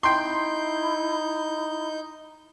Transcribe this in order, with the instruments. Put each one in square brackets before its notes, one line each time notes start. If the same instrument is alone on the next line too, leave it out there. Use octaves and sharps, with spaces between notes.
[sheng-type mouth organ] D#4 G6 [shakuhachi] E4 [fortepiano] G5 C6